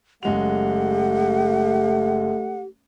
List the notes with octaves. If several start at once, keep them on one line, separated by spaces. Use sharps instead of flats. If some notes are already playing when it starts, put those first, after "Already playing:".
F#1 G#3 A3 G4 F#5 F7